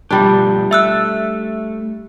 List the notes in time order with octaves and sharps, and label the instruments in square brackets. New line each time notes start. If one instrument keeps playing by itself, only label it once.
[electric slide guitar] B2 F3 G4 [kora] G3 D4
[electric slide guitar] A3 [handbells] E5 E6 F#6